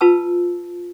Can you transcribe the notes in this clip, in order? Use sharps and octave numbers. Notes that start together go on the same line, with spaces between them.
F4 B4 A5 E6